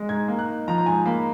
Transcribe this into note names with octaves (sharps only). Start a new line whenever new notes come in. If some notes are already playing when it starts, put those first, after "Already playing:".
Already playing: G#3
G#2 G#6
A#3
F#6
D#4
F3 A#5
A#5
G#2 G#5
A#3 B5